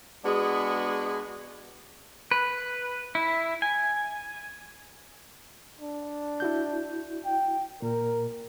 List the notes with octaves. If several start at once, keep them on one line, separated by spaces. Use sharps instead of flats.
G#3 B3 D4 F#4 G#4
B4
E4
G#5
D4
E4 F#4 G6
G5
A#2 A#4